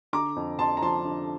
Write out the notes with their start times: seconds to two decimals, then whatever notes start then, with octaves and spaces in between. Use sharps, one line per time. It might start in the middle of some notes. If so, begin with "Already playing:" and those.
0.13 D3 A#5 D6
0.36 F2
0.58 F2 A5 C6
0.77 A#5
0.82 F3 A5 C6
1.05 D3